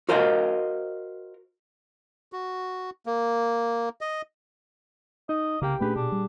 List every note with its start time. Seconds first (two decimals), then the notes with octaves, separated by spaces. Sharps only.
0.09 F#4 A#4 C5 D#5 F5
2.33 F#4
3.06 A#3
4.01 D#5
5.29 D#4 D#5
5.62 C2 C#3 A#3 G4 G5
5.81 A#2 A3 C#4 D4 G4 G#4 B4
5.96 B2 D4
6.12 G3